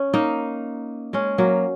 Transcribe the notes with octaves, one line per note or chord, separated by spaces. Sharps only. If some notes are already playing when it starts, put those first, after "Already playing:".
Already playing: C#4
A#3 D#4
G#3 C#4
F#3 A#3